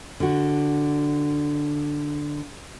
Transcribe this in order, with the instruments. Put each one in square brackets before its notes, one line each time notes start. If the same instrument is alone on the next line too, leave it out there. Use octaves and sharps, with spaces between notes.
[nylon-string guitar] D3 F#4